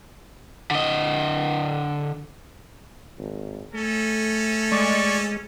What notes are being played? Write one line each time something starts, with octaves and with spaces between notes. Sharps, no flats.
D3 D#5
G#1
A3 C#4 A4
G#3 D5 C#6